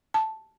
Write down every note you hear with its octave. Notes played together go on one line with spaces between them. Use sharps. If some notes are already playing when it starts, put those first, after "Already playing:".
A5